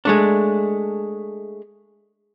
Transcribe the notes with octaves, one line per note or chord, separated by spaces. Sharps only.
G#3 A3 D4